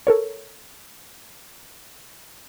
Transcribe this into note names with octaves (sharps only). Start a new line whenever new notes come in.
A4 A#4 C#5